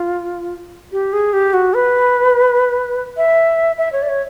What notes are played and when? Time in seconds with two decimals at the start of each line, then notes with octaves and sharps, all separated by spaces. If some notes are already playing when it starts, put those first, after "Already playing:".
Already playing: F4
0.92 G4
1.13 G#4
1.33 G4
1.53 F#4
1.74 B4
3.17 E5
3.78 E5
3.92 C#5
4.02 D5
4.09 C#5